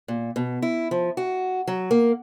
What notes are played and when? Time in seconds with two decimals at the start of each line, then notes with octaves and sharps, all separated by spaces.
0.08 A#2
0.36 B2
0.62 E4
0.91 F3
1.17 F#4
1.68 F#3
1.91 A#3